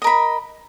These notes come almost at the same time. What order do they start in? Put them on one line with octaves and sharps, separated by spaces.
D#5 A#4 B5